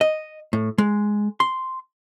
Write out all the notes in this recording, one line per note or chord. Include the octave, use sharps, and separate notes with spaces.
D#5
A2
G#3
C6